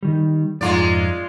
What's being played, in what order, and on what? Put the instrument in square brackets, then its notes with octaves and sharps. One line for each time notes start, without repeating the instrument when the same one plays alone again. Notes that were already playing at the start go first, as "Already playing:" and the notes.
[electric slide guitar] D#3 G3
[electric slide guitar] F2 G#2 A#5 [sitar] G#3 F4 D5